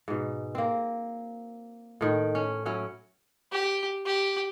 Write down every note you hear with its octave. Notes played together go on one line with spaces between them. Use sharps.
G#2 B2
A#3 C4
A2 D#3
C#4
F#3 C#4 E4
G4
G4